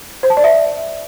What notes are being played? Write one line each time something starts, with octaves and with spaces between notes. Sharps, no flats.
C5
A5
D5
E5